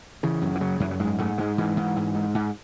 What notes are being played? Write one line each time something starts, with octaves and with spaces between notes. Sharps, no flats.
C#3 E3
F#2
E3
C#3 F#3
F#2 E3
F#3
G#2 G#3
G#2 A3
G#2 G#3
G#2 E3
G#2
G#2
G#2
G#2